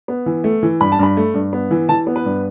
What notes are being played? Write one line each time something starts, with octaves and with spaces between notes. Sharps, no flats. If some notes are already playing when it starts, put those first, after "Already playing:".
B3
E3
A3
E3
G2 B5
A5
G2 B5
A3
G2
B3
E3
E3 A5
B3
B4
G2